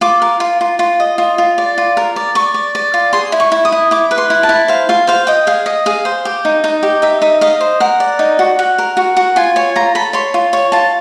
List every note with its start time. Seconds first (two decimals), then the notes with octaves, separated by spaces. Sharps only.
0.01 F4 D6
0.22 A#4
0.40 F4
0.61 F4
0.79 F4
1.00 D#5
1.18 F4
1.38 F4
1.58 D5
1.78 F4
1.97 A#4
2.16 D5
2.35 D5 C#6
2.54 D5
2.75 D5
2.94 F4
3.13 G#4 C6
3.32 E4
3.40 C#6
3.52 E4
3.65 D#6
3.72 E4
3.91 E4 D6
4.11 B4
4.18 C6
4.30 E4
4.43 A5
4.49 E4
4.68 C5 F5
4.89 F4 F5
5.07 C5 F5
5.27 D#5 G5
5.47 G#4 F5
5.66 D#5
5.86 G#4 F5
6.05 C5
6.25 G4
6.45 D#4
6.64 D#4
6.83 G4
7.02 D#4 E5
7.22 D#4 E5
7.41 D#5 F5
7.61 C5
7.80 A#4 F#5
8.00 D5
8.19 D#4
8.39 F#4
8.59 F#4
8.78 A#4
8.97 F#4
9.17 F#4
9.36 F4 G#5
9.56 C#5 G#5
9.76 F4 A#5
9.95 A4 B5
10.13 C#5 C6
10.34 F4
10.53 C#5 C#6
10.72 F4 A5